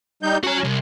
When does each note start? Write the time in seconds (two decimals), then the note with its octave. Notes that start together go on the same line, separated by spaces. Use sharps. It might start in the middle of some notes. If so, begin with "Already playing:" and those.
0.23 G3 D#4 G6
0.44 C#4 F#4 A#5
0.64 C2